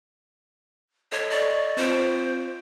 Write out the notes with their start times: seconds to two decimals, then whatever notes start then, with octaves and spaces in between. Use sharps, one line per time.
1.12 A4 C#5 D#5
1.30 D5 D#5 C#6
1.77 C4 F4 C5 D7